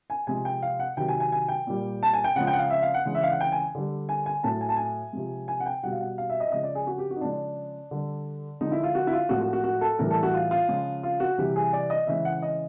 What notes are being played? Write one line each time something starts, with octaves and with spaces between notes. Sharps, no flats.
G#5
C3 F3 G#3 G#5
G5
F5
F#5
C3 D#3 F#3 G5
G#5
G#5
G#5
G5
A#2 G3
A5
G#5
G5
C#3 F3 G#3 F#5
G5
F#5
F5
E5
F5
F#5
C#3 E3 G#3
E5
F5
F#5
G5
G#5
D3 G3
G#5
G#5
A2 F#3 A5
G#5
A5
G#5
C3 F3 G#3
G#5
F#5
G5
B2 G3 F#5
F5
F#5
F5
E5
D#5
E5
C#3 F3 G#3 D#5
D5
G#4
F#4
G4
F#4
D#4
C#3 F3 G#3 D4
D3 G3
D3 F3 G#3 D#4
E4
F4
F#4
E4
F4
A2 F3 G#3 F#4
F#4
F#4
F#4
A4
A2 E3 G3 A#4
A4
F#4
F4
F4
C#3 F3 G#3
F4
F#4
C3 E3 G3 G4
G#4
D5
D#5
C#3 E3 G#3 E5
F#5
D#5